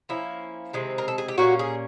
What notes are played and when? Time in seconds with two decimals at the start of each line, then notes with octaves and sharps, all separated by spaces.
0.09 F3 A#3 C#4 E4
0.73 C3 D#3 G#3 C4
0.98 A#4
1.08 A4
1.18 G#4
1.28 G4
1.38 A#2 G3 A#3 C#4 F#4
1.59 G#4